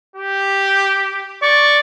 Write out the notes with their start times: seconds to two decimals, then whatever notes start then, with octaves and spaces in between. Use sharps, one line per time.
0.16 G4
1.42 D5 C#6